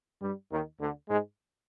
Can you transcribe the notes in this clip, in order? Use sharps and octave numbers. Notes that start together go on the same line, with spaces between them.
G2 G3
D#2 D#3
D2 D3
G#2 G#3